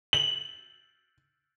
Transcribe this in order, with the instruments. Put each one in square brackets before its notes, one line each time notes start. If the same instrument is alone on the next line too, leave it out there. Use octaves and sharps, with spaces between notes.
[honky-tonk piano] F#7